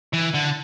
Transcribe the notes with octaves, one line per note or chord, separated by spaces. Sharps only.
E3
D3